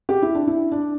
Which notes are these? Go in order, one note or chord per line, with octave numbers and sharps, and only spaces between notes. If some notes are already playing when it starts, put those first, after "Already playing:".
G4
E4
D4
E4
D4